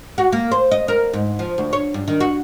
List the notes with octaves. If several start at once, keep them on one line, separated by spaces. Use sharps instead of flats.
F#4
A#3
C5
D#5
A#4
G#2
F3
D2
C#5
G2
D#3
F#4